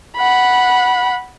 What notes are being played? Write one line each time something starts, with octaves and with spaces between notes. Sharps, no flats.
F#5 B5